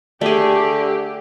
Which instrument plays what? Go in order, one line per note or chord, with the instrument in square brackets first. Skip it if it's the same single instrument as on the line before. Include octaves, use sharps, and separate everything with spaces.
[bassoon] D3 [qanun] A3 G#4 [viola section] G4